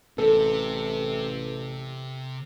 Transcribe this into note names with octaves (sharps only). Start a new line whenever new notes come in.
A1 C3 A4